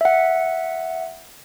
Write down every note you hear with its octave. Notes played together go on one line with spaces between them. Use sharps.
E5 F#5